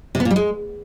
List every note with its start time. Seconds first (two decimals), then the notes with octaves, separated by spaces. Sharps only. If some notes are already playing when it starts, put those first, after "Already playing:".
0.15 C3
0.20 B3
0.25 A#2
0.31 G3
0.36 G#3